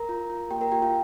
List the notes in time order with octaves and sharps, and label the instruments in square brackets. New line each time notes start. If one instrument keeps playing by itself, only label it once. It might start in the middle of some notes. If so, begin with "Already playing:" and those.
Already playing: [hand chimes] A#4 A#5
F4
F4
A#3 G4 G5
A#4 A#5
F4 G4 G5
F4 F5